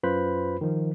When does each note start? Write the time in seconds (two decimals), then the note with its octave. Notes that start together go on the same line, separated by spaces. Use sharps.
0.03 F#2 F4 B4 C5 B5
0.61 D#3 F3